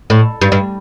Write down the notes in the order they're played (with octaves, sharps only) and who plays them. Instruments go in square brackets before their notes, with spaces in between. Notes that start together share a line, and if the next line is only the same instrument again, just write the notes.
[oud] A2
G2
G2